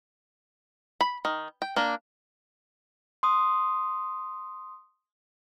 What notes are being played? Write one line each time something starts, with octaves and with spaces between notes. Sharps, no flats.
B5
D#3
G5
A#3 D4
C6 D#6